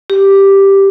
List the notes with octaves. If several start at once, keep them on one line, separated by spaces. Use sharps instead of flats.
G4